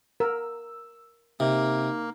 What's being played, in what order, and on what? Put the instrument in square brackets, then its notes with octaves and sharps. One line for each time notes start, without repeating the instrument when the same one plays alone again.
[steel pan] A#4 [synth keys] E6
[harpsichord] C3 [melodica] A#3 [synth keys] D#4